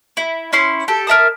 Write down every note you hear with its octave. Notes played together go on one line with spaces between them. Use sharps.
E4
C#4 E4 C6
G4 A4
A#4 E5 A5 D#6